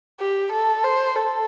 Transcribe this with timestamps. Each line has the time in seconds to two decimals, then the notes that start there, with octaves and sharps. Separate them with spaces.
0.20 G4
0.53 A4
0.84 C5
1.16 A4